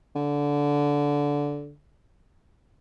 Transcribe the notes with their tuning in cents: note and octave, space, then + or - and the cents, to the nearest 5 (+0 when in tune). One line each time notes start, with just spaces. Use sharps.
D3 -15